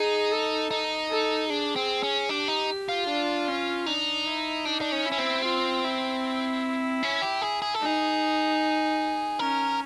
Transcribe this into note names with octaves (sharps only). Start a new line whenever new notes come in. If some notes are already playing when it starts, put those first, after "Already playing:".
Already playing: D#4 G#4
A4
D#4
A4
D4 G#4
C4
C#4
D4 G4
D#4
F4
D4
C#4
D4 D#4
E4
D4 D#4
D4
C#4
E4
C#4
C4
F4
E4
C#4
G4
G#4
G#4
A4
D#4 G#4
C#4 A#4